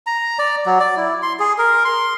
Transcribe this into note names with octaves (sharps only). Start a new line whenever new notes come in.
A#5
D5
F#3
D5
E4
C6
G#4
A#4
C6